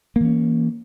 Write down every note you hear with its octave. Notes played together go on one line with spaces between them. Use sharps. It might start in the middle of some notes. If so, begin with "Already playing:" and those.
E3 A#3 C#4